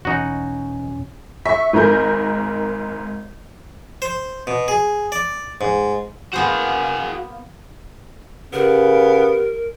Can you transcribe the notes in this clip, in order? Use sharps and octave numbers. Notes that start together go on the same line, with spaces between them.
E2 B2 C#4 D#4 F#4
E5 C#6 B6
G#1 G#2 A#4 G6
C5
B2
G#4
D5
G#2
A#3 B3 F#4 G#4 C5
C#3 B3 G4 A#4